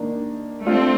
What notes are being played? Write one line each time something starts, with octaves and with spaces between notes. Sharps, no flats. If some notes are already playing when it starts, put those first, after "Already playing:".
Already playing: D#3 A#3 D4
A3 C4 D4 F4